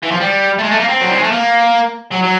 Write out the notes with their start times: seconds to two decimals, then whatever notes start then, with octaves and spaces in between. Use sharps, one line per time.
0.03 E3
0.11 F3
0.20 G3
0.58 A3
0.63 G#3
0.71 A3
0.80 A#3
0.88 C4
1.01 F#3
1.08 G3
1.16 G#3
1.23 A3
1.32 A#3
2.11 F#3
2.22 F#3